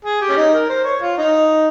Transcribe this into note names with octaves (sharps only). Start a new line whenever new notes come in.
G#4
G4
C#4
D#4
A#4
C5
C#5
F4
D#4